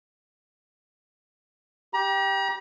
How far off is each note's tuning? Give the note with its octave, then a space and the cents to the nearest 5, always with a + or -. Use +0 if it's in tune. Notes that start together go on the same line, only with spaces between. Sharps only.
G4 +0 A#5 +45